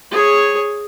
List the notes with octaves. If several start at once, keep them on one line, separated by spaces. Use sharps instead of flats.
G#4 C#5